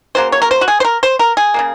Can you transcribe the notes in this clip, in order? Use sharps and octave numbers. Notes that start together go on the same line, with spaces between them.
C#3 F#3 A#3 C5
C#5
A#4
C5
F#4
G#4
C5
A#4
C5
A#4
G#4
C#3 F#3 A#3